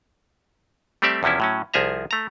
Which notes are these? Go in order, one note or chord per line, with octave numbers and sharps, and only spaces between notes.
G3 A3 C4 G4 D5 E5
E2 C3 F3 C#4 E4
A2 F#3 C#4
C2 F3 G#4 E5 A#5
A3 A#5